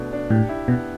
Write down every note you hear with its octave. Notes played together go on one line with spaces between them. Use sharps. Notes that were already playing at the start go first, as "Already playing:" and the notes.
Already playing: B2 A3 D4
D4
A2 G4
E4
B2 B3